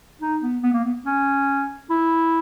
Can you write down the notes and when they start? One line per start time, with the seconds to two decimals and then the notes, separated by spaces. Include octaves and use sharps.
0.21 D#4
0.43 B3
0.63 B3
0.74 A#3
0.84 B3
1.06 C#4
1.90 E4